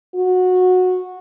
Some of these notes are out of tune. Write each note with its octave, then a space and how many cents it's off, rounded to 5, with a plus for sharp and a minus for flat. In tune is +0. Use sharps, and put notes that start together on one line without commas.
F#4 -15